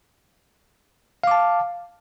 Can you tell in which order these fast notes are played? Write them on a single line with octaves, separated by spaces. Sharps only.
F5 D6 A5